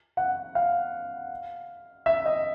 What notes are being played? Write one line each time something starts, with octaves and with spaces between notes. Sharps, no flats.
F#5
F5
E5
D#5